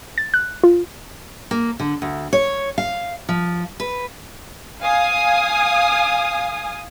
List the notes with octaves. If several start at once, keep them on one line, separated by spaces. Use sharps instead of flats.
A6
F#6
F4
A#3
D3
D2
C#5
F5
F3
B4
F5 G#5 D#6